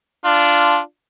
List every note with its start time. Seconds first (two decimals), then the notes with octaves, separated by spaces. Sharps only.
0.25 D4 F4